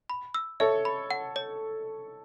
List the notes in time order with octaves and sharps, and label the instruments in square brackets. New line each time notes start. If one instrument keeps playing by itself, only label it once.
[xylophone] B5
E6
[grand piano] A4 C#5 [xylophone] E5
[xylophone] B5
F#5
C#5